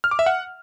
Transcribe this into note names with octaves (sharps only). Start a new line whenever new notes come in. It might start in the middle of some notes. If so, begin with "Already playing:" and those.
F6
D6
E5
F#5